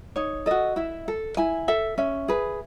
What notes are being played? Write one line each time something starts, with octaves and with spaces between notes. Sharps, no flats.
D#4 C#5
F#4 A4 D#5
E4 E5
A4
E4 G#5
A4 E5
C#4 E5
G#4 B4